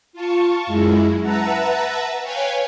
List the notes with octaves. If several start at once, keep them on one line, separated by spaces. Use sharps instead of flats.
F4 A5 C#6
F#2 G#3 E4
B4 E5 F#5 A5 A#5
B4 C#5 F5 G5 G#5